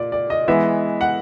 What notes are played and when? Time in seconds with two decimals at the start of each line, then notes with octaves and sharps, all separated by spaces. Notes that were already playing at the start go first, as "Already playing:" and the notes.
Already playing: A#2 D5
0.12 D5
0.30 D#5
0.48 E3 G#3 B3 E5
1.01 F#5